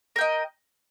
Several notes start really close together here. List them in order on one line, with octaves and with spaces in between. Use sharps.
A#4 G5 D#5